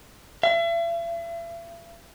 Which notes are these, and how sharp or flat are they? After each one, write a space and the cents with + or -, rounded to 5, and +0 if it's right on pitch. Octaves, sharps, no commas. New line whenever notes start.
E5 +40